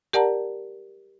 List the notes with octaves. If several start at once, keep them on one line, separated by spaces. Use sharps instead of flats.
G4 A#4 D5 F#5 A5 A#5